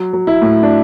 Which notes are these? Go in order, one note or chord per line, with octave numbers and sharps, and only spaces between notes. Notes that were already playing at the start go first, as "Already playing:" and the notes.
Already playing: F#3
F#3
E4
A2
D4